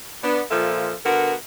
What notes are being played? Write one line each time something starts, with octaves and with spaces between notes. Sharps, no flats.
B3 D4
A#2 F3 F4 A4 E5
D3 B3 F#4 A#4